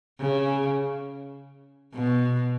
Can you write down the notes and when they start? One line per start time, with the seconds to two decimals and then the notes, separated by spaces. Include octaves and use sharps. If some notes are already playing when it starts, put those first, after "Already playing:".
0.20 C#3
1.94 B2